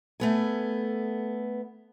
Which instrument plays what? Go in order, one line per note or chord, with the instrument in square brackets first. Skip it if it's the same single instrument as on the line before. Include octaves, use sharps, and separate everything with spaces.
[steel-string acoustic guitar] A3 B3 G#5